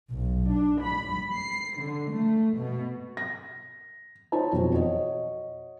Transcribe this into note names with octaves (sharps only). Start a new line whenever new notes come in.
B1
D4
B5
C7
D3
A3
B2
A#6
D#4 C5 C#5 A5
E1 F2 D#4
F#4 C#5 D#5